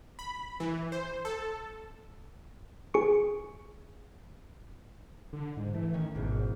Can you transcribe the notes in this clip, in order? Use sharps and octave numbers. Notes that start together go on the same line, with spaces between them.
B5
E3
C5
A4
G#4 C#6
D3
G#2
E3 A3
D#3 C#4
G#1 E2 G#2 B2